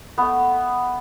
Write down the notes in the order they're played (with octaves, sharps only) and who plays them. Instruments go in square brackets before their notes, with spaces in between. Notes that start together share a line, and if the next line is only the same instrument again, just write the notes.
[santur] A3 B3